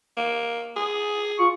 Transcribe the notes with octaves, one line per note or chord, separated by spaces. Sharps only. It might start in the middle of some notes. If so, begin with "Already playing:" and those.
A#3
G#4
F4 C#6